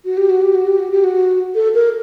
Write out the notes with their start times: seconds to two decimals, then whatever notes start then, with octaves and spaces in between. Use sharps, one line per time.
0.05 F#4
0.17 G4
0.30 F#4
0.42 G4
0.55 F#4
0.67 G4
0.79 F#4
0.91 G4
1.04 F#4
1.55 A4
1.75 A#4